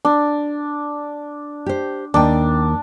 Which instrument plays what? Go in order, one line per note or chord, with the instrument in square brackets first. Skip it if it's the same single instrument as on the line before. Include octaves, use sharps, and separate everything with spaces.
[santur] D4
[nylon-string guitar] G4 C5
[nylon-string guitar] D#2 G5 [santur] D4